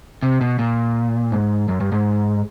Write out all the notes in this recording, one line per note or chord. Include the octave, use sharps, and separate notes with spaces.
C3
B2
A#2
G#2
F#2
G2
G#2